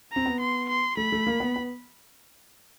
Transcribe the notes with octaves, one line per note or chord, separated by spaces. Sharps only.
C4 A#5
B3
C6
C6
A3 B5
A3
A#3
B3
B3